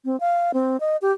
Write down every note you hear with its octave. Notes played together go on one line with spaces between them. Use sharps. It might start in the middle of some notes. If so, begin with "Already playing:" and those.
C4
F5
C4
D#5
G4